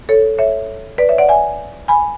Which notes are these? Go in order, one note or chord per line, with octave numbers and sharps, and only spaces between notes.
A4 C#5
C#5 E5
B4 D5
C#5 E5
D5 F#5
E5 G#5
G#5 B5